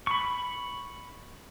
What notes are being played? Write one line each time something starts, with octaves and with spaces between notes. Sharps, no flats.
B5 C#6